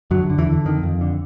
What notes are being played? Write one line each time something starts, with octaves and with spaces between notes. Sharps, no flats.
F#2 D3 F#3
D3
E2 E3
D3
F2 D#3
F2
D3